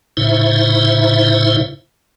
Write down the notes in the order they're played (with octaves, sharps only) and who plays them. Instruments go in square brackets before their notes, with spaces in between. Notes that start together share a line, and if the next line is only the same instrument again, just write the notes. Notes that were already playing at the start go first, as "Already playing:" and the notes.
[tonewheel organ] A2 C#3 D#4 E4 C5 E5